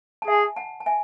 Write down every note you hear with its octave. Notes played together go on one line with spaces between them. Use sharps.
A5
G#4 E5 G#5
F#5 A5
A5
E5 G#5